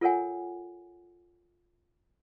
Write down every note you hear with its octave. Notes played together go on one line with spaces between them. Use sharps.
F4 A4 A#4 C#5 F#5 G#5